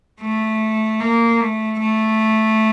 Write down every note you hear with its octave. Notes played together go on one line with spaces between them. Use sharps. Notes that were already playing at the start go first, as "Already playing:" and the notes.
A3
A#3
A3
A3